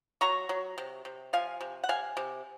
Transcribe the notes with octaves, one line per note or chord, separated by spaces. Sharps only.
F#3 A#5 C#6
F#3
C3
C3
F3 F5 G#5
C3
F#5
C3 F5 G#5
C3